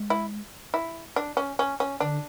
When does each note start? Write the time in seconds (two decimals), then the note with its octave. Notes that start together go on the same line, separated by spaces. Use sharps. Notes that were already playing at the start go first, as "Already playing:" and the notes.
Already playing: G#3
0.10 E4
0.74 E4
1.16 D4
1.37 C#4
1.59 C#4
1.80 C#4
2.00 D3 D4